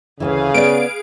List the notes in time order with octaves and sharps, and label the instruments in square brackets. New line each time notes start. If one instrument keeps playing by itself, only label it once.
[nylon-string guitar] D2 G#2 E3 [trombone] C#3 [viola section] G#4 B4 F5
[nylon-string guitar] B3 C#4 D5 [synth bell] D7